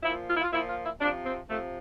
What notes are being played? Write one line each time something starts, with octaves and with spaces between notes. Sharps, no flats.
A#2 F3 E4
F4
E4
F4
A#2 F3 E4
F4
E4
C3 F3 D4
C4
C3 F3 A3